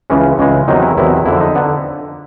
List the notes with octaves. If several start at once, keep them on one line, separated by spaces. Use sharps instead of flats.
C#2 C#3 E3 G#3 C#4
C#2 C#3 E3 G#3
E2 C3 D#3 F#3 D#4
E4
E2 C3 D#3 F#3 E4
F2 D3 F3 E4
D#4
D3 B3